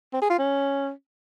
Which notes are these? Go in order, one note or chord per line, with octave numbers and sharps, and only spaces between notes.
C4
G#4
F4
C#4